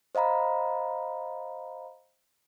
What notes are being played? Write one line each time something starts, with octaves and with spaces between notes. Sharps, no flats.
C5 D#5 F5 A#5 B5